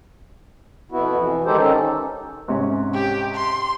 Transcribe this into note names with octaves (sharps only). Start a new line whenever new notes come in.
F2 B2 B3 E4 F#4
E3
D#3 G#3 D#4 G4 A4 C5
D#3 C#4 D#4 A4
G#2 C3 C#4
G4
C6